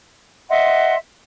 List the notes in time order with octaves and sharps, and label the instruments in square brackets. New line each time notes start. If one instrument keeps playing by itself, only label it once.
[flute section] D#5 E5 F#5 C6